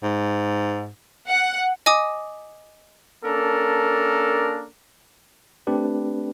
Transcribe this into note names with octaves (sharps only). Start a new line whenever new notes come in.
G#2
F#5
D#5 G#5 D6 D#6
A#3 C#4 D4 A4 A#4
A3 C4 D4 G4 B4